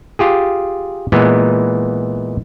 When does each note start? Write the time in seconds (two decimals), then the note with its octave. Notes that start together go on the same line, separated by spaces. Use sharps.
0.19 F4 G4 G#4
1.12 A#2 E3 G#3 B3